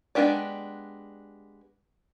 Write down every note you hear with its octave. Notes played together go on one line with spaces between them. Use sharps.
G#3 B3 D4 G4 D5